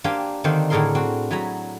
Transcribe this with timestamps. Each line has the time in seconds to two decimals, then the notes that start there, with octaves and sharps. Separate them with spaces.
0.04 A#3 D4 G4 C5 F5 G#5
0.44 D3 D#3 A#3 C4 D4 C5
0.70 A2 D3 D4 G#4 A#4 C6
0.95 C4 D4 F#4
1.31 A2 F#3 G#5 A#5 B5